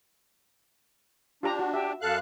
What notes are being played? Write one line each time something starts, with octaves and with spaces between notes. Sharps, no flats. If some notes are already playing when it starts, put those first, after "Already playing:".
D4 F4 G4 A#5
F#4
G4 E5
F#2 A4 F5 F#6